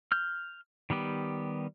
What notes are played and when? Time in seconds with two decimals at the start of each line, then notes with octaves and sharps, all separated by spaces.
0.12 F6 G6
0.90 D#3 G3 B3 G4